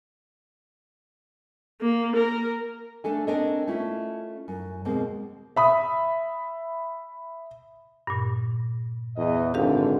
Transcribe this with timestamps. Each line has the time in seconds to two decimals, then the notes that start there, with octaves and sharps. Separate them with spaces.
1.81 A#3
2.16 A#4
3.04 A3 D4 A4 G#5
3.27 C4 D4 A4 A#4 C#5 D#5
3.67 A3 C#4 E4 F4
4.48 F#2
4.85 D#2 B2 G#3 A#3 C4
5.56 E5 B5 D#6
8.07 G2 A#2
9.17 E2 D#5
9.54 G#1 D3 G4 F5